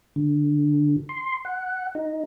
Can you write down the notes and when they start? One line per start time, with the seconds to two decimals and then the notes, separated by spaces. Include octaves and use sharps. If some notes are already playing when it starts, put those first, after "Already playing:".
0.16 D3
1.09 C6
1.45 F#5
1.95 D#4